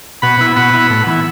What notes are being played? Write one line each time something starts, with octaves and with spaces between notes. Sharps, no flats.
B2 F#5 B5
B3 E4
B2 F#5 B5
B3 E4
A2
E3 B3 E4